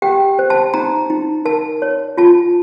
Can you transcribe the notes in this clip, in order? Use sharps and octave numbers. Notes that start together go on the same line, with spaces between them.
G4 G5
C5
A5
D#4 A#5
D#4
A#4 A5
C#5
F4 A5